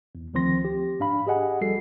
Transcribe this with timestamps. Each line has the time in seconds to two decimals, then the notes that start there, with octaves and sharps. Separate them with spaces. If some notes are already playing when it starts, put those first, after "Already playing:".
0.15 E2
0.34 D2 D#3 F3 C4 C6 A#6
0.65 G4
1.00 G#2 D4 F5 B5
1.27 G4 G#4 D#5 F#5 G#5
1.61 A#1 G3 F#4 A4 C7